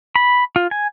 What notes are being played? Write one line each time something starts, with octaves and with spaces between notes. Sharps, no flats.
B5
F4
G#5